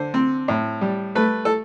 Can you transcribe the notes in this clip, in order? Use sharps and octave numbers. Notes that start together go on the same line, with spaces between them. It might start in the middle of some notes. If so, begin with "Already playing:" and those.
Already playing: D3 C5
C4
A2
G3
A3 B4
A4